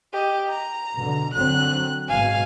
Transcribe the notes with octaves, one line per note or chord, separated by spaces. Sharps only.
G4 D#5
A#5
B2 D3
D3 F#3 C4 F#6
G#1 B2 F5 G#5